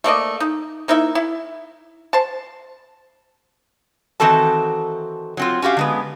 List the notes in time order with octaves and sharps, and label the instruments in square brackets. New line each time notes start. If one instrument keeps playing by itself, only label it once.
[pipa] A3 A#3 D5 D#5
D#4
A#3 D#4 E4 E5
E4
C5 A5
[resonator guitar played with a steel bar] D#3 E3 C4 F#4 A4 A5
F#3 C4 F4
C#4 F#4 G4 F5
D3 G#3 B3